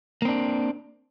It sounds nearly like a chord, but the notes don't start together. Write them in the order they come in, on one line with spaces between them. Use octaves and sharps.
A#3 C4 D4